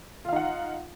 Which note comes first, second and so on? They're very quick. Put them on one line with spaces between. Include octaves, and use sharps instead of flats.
F4 F5 D#4 F#5